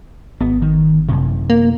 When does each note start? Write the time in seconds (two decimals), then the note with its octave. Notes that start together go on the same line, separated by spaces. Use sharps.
0.41 G#1 B3
0.62 D#3
1.08 F#2 C3
1.50 A#3